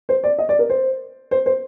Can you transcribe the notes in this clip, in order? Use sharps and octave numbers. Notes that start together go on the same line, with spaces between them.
C5
D5
D#5
D5
A#4
C5
C5
C5